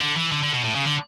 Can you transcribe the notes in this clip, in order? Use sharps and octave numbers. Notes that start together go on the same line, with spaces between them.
D3
E3
D3
D3
B2
A2
C#3
D3